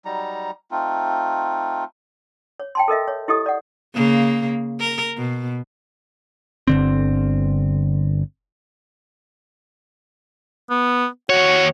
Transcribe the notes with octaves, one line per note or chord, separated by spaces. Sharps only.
F#3 G3 D#4 A#5
A3 C4 D#4 F4
C#5
G5 A5 C6
A4 A#4 D#5 E5
C#5
E4 G4 A4 D#5 D#6
D5 F#5
C#3 A#3
A#4
B2
G1 D3 C4
B3
D#2 F#4 C#5